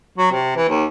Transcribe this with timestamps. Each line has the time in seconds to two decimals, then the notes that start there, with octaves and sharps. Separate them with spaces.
0.18 F#3
0.32 C3
0.56 E3
0.69 D#2